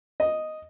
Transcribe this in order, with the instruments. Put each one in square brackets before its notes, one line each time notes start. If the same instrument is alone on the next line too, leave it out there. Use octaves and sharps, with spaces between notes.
[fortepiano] D#5